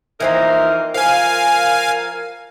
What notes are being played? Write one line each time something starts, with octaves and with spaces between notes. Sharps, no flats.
E3 F3 A#3 C4 D#4 A#4
F3 A#4 F5 G#5